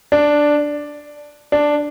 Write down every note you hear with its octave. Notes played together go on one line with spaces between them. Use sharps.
D4
D4